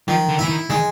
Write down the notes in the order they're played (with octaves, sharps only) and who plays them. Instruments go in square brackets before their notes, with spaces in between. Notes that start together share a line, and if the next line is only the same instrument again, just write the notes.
[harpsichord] D#3 [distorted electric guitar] F3
[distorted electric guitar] D3
[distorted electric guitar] E3 [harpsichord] E4
[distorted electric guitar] D#3
[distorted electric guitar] D#3 [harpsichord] G#3